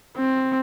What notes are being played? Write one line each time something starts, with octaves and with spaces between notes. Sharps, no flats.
C4